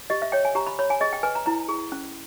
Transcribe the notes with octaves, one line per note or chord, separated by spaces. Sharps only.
G4 D#5
E5
C#5 G5
G#5
G4 A#5
B5
C#5 B5
G#5
G#4 D#5
G5
B4 G#5
A#5
E4 A#5
G#4
C#4